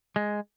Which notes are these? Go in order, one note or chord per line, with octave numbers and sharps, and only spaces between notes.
G#3